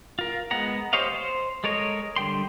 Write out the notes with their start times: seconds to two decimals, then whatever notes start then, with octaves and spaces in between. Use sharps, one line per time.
0.19 F4 A#4
0.51 G#3 B3 F#5 A#5
0.93 G4 C5 C#5 D#5 F5
1.15 C5
1.64 G#3 A4 A#4 C#5 D#5
2.16 D3 G3 G5 C6